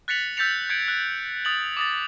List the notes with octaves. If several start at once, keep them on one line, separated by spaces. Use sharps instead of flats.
F#6 A6 B6 C#7 F7 F#7
E6 G6 A6 B6 C#7 F7
G6 G#6 C#7 D7
F#6
D#6 A6 F#7
D6 D#6 A6